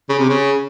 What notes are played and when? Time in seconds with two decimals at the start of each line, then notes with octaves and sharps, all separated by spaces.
0.09 C#3
0.19 C3
0.29 C#3